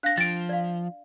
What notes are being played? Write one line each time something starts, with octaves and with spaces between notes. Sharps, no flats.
D4 F5 G5 F#6 A#6
F3 G5 A6 D7
D5 F5